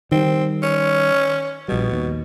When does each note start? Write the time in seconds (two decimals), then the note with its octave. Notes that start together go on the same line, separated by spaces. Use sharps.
0.12 D#3 G3 C4
0.63 C#4
1.68 A#1 B2 G3
1.92 D#2